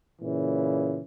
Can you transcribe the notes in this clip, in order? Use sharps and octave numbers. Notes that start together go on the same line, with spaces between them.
A#2 C#3 E3